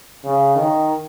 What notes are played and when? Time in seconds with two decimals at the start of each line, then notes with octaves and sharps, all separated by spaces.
0.24 C#3
0.56 D#3